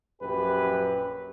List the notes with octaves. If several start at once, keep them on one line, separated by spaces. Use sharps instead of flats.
A#1 F#2 G4 B4